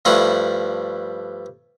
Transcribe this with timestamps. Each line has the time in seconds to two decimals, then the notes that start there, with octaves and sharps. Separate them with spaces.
0.05 G2 F3 A3 D4 E4 F#5